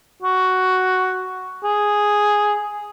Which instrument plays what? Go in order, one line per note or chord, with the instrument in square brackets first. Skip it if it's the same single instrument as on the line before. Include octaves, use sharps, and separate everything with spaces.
[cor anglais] F#4
G#4